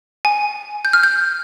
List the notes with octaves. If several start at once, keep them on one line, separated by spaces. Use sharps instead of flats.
G#5
G6
F6
G6